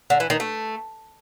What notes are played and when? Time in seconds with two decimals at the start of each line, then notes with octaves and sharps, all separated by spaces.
0.10 D3
0.20 E3
0.30 D#3
0.40 A3